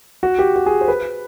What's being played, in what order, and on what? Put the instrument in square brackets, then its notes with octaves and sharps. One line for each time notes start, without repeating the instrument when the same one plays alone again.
[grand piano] F#4
G4
F#4
G#4
C5
B4